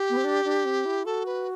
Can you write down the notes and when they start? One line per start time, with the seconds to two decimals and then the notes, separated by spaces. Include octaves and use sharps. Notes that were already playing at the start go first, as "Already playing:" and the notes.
Already playing: G4
0.10 B3
0.17 C4
0.24 D4
0.45 D4
0.65 C4
0.86 E4
1.06 F#4 A4
1.26 B4